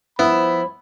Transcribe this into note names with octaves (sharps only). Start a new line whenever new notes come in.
F3 B3 E4 C5 B5